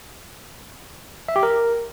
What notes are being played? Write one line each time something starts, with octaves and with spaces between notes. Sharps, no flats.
E5
G4
A#4